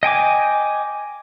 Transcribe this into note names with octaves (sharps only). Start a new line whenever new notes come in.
D#5 G5 G#5 D6